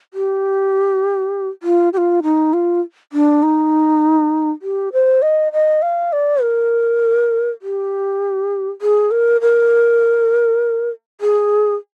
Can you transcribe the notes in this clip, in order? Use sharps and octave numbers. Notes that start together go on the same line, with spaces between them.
G4
F4
G4
F4
D#4
F4
D4
D#4
G4
C5
D#5
D#5
F5
D5
A#4
G4
G#4
A#4
A#4
G#4